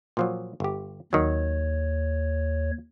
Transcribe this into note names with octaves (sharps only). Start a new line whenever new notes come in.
A#2 F3 F#3
G1 G4
D#2 D#3 F#3 C#5